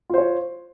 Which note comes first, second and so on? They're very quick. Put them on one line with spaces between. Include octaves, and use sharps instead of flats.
F4 C5 C#5